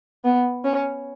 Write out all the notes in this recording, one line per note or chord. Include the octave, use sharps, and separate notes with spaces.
B3
C#4